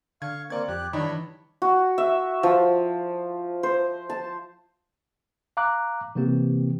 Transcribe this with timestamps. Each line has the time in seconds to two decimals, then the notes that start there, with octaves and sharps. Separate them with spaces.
0.22 D3 F5 C#6 G#6
0.50 A#3 C4 D5 C#6 G#6
0.68 F2 G4 F#6
0.93 G2 D#3 E3 D4 C#5 B5
1.62 F#4
1.98 E5
2.43 F3
3.63 C5
4.10 A5
5.57 F5 A#5 D6 F#6
6.15 C3 E3 A#3 C4 G4